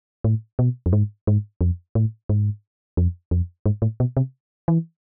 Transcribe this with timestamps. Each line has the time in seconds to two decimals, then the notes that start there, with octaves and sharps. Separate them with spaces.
0.24 A2
0.59 B2
0.86 F2
0.93 G#2
1.27 G#2
1.61 F2
1.95 A2
2.29 G#2
2.97 F2
3.31 F2
3.66 G#2
3.82 A2
4.00 B2
4.17 C3
4.68 E3